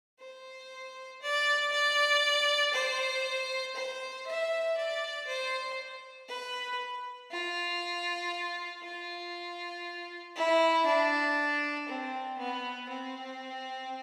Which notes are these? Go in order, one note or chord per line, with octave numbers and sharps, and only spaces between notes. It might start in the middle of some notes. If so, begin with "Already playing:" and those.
C5
D5
D5
C5
C5
E5
D5
C5
B4
F4
F4
E4
D4
C4
B3
C4